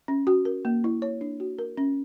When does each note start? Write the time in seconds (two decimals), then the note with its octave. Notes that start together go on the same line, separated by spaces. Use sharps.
0.08 C#4
0.27 F#4
0.45 A#4
0.65 A#3
0.84 E4
1.02 C#5
1.21 D4
1.40 F#4
1.58 A#4
1.77 C#4